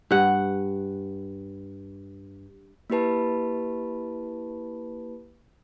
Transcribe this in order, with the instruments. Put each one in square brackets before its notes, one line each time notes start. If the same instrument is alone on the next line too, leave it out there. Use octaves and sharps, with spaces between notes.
[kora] G2 F#5
[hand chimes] A#3 E4 G4 B4 A5 B5